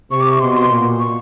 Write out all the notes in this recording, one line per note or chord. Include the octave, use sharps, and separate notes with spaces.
C3 C#6
D6
C#6
B2 C6
C6
A#2
C#6